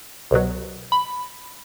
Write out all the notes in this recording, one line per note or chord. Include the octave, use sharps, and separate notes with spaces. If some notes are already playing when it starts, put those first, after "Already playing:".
C2 B2 F#3
B5